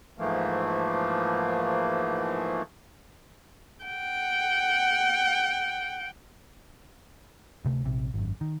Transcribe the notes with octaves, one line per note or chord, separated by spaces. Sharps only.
G#2 E3 F3 A3 A#3
F#5 G5
D2 C3 A3
A#1 C3
G#1 F#2
D#3